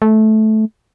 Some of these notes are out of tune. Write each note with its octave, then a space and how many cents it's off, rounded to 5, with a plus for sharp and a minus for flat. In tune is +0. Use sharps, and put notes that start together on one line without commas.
A3 -15